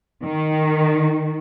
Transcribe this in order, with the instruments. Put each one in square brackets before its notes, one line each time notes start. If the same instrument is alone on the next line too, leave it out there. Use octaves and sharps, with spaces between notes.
[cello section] D#3